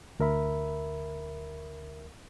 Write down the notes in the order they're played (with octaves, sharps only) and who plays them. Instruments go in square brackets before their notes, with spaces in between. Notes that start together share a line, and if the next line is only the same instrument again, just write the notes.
[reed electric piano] D2 A#4 E5 B5